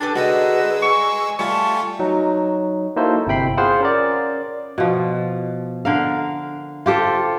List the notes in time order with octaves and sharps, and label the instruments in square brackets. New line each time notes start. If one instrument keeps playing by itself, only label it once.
[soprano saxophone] D4 [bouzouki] G4 A4 G#5 [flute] B4
[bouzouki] D3 D#4 G#4 [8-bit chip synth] G#3 E6 [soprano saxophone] F#4 [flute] B4
[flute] G#5 [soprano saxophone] C#6
[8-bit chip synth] G3 A3 F4 [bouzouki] A5 [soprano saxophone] C#6
[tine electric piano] F#3 D#4
A#3 D#4 E4 F#4 A4 C5
G1 C3 E4 G5 B5 C7
F4 G#4 C5 F5 F#5
C#4 A#4 D5
[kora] B2 F3
D3 A#4 F5
F4 G4 A4 C5